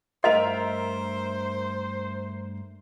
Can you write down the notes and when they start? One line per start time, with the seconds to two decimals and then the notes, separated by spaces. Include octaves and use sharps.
0.24 G2 A3 A#4 C5 D#5 E5 C6 F7